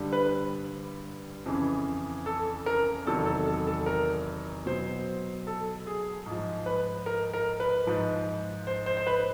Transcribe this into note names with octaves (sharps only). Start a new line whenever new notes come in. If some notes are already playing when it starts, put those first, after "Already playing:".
Already playing: G2 D3 G3
B4
F2 C#3 E3
A4
A#4
E2 C3 D#3 F#3 A4
A4
A4
A4
A#4
B2 F#3 C5
A4
G#4
G#2 F3
B4
A#4
A#4
B4
G#2 F3
C5
C5
C5
B4